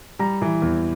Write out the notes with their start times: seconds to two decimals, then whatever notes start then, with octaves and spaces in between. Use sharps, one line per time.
0.19 G3 A#5
0.42 E3
0.62 E2